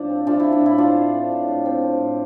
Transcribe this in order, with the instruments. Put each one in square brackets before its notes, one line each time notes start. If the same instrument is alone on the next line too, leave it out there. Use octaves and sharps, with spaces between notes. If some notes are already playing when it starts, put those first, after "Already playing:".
Already playing: [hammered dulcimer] A2 F3 D4
C4
A3 D4 F4
A3 E4
D4
A2 E4
C4 D4 F4
A2
C4
A2
A2
C4
C4
A2